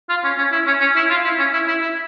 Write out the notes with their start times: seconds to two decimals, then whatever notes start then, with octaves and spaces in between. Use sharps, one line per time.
0.09 F4
0.24 C#4
0.38 C#4
0.52 E4
0.67 C#4
0.80 C#4
0.96 E4
1.10 F4
1.24 E4
1.39 C#4
1.53 E4
1.68 E4
1.82 E4